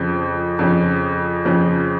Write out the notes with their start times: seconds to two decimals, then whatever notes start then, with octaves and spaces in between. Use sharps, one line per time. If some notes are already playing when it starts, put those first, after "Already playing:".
Already playing: F2 C#3 F3
0.59 F2 C#3 F3
1.45 F2 C#3 F3